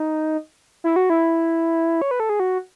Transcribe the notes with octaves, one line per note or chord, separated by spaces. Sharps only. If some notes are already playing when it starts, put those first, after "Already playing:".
Already playing: D#4
E4
F#4
E4
C#5
B4
A4
G#4
F#4